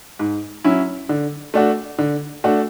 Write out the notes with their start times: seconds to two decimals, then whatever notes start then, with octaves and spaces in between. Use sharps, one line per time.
0.19 G#2
0.64 F#3 C#4 E4
1.09 D3
1.54 A3 D4 F#4
1.98 D3
2.44 A3 D4 F#4